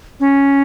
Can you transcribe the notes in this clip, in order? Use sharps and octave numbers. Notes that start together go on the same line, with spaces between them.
C#4